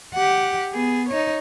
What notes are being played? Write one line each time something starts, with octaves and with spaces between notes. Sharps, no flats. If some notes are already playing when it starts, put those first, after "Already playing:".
G4 F#5
B3 G#4
D#4 C#5